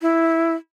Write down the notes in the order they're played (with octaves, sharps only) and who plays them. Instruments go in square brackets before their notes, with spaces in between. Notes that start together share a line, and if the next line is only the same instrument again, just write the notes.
[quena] E4